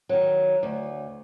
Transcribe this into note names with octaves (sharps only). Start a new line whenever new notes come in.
D#3 F#3
D2